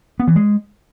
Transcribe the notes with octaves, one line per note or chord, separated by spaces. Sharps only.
B3
E3
G#3